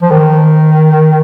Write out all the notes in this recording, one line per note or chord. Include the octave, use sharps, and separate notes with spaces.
F3
D#3